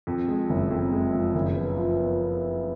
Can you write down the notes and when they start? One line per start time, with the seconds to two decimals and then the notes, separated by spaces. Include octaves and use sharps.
0.07 F2
0.28 G#3
0.49 F#1
0.71 F2
0.92 G#3
1.13 F3
1.34 F#1
1.56 B3
1.77 F3
1.99 B3